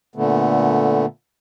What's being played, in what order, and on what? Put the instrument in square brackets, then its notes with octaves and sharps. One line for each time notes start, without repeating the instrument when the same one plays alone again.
[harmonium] A#2 D3 A3 B3